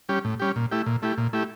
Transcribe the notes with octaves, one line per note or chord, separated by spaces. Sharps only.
G3 C#4 G4
A2
G3 C#4 G4
A#2
A3 E4 G4
A#2
A3 E4 G4
A#2
A3 E4 G4